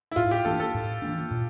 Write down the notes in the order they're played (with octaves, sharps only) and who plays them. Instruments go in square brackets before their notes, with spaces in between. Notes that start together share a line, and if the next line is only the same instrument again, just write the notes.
[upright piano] E4
[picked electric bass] A2 [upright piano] F4
[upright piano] G4
[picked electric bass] E3 A#3 D4 [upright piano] A4
[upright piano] A4
[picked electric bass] A2
E3 A#3 D4
A#2